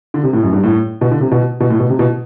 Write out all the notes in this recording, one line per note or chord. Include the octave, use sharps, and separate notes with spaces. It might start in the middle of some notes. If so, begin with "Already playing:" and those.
D3
C3
A2
F#2
G2
A2
B2
D3
C3
B2
B2
A2
B2
C3
B2